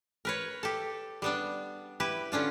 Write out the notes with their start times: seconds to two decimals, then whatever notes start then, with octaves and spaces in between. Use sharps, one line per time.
0.25 A#4 B4 C#5
0.63 G4 A4
1.22 G3 B3 D4
2.00 E4 G4 B4
2.32 D3 C#4 D4 F4